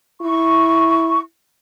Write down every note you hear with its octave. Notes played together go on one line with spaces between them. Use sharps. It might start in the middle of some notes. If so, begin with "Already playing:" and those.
E4 C#6